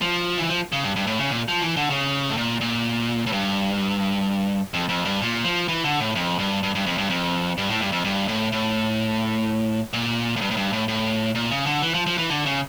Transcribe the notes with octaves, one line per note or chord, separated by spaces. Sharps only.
F3
E3
F3
C#3
G2
G2
A2
C#3
A#2
F3
E3
D3
C#3
A2
A#2
A#2
A2
G2
F2
F2
G2
A#2
F3
E3
D3
A2
F2
G2
G2
G2
F2
G2
F2
G2
A2
G2
F2
G2
A2
A2
A#2
A2
G2
A2
G2
A2
A2
A#2
C#3
D3
E3
F3
F3
E3
D3
C#3